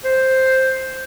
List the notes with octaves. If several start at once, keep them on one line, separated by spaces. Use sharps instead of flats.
C5